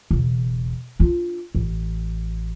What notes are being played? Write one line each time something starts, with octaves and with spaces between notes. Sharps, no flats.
E1 C#3
D4 F4
A1